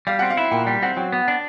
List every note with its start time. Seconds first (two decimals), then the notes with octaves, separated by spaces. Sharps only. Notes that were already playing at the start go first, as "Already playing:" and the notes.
0.07 G3 F5
0.19 C4 F#5
0.30 F5
0.37 E4
0.51 A#2 G5
0.67 G3 G5
0.82 C4 F#5
0.97 F#3 G5
1.12 B3
1.28 D4